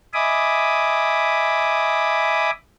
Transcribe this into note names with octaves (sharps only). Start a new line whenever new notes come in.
D#5 E5 G#5 B5 D6 D#6